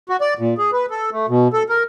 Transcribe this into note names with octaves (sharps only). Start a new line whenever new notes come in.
F#4
D5
A#2
G#4
B4
A4
A3
B2
A4
A#4